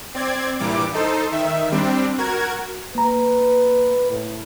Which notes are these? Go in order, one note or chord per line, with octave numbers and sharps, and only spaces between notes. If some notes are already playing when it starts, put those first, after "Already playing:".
C4 D5 G#6
G2 A#2 E3 G3 D6
D#4 A4 C5
D#3 E5
G3 C4 D4
F#4 A#4 G#6
A#3 B4 A#5
A2